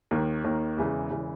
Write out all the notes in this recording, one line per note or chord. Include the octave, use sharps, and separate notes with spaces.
D#2 D#3 A#3
D#2 D#3 A#3
E1 E2 C#3 E3
E1 C#3 E3